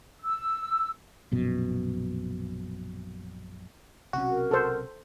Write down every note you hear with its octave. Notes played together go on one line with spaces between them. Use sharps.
E6
A#1 F#2 B2
B1 C3 C#4 F#4
A#4
A4 C5